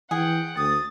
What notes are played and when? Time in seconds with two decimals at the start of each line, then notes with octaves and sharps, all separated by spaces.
0.11 E3 G#4 F#5 G5
0.57 D2 D#6 A6